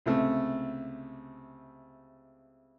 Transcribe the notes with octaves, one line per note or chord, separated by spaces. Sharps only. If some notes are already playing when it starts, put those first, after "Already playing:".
C#2 C3 A3